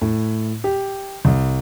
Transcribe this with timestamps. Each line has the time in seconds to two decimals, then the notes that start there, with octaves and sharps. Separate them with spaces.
0.01 A2
0.64 G4
1.25 C2